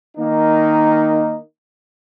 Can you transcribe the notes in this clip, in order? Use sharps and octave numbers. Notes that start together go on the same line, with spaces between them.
D#3 A#3 D#4